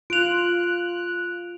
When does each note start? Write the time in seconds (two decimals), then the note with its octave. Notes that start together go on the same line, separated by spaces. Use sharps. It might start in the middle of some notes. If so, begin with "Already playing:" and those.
0.10 F4 F#6 D7 F7